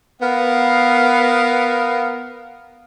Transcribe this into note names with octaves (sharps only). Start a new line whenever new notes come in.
B3 A#4 F5